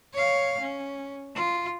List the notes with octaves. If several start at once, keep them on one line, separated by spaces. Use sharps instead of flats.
C#5 F5
C#4
F4